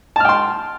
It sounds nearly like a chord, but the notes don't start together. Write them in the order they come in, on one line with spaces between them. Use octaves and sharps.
A5 F6 G5 C6